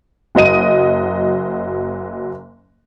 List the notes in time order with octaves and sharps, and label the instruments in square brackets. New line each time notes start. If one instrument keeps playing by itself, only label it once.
[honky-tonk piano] F#1 F#3 D#5 D#7